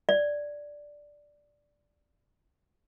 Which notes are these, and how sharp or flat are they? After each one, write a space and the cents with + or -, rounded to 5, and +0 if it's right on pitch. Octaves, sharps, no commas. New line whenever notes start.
D5 +0